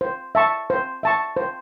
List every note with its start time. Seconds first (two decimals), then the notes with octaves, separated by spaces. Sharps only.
0.01 C5
0.35 E5 A5 C#6
0.70 C5
1.03 E5 A5 C#6
1.37 C5